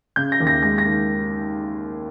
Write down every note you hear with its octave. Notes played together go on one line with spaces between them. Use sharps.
C#3 G6
A#6
D#2
A#6
G#3 A#6
A#6
D#3